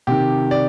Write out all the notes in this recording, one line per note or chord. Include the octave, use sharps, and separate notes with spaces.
C3 D#3 G4
D5